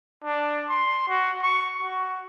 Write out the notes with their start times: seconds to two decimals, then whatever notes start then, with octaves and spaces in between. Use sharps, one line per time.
0.24 D4
0.69 C6
1.08 F#4
1.42 C#6
1.82 F#4